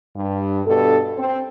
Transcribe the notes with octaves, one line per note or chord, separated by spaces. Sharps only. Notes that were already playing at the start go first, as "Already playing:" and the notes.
G2
G2 B2 A4
C4